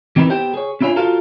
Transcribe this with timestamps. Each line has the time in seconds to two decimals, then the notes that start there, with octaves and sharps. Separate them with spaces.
0.16 E3 C4 D#4 A#4 B4
0.30 B3 G4 C5 G5
0.54 G#4 C#5
0.81 C#4 D4 E4 F4 C#5 G#5
0.96 F4 F#4 A4 A#4 C5 F5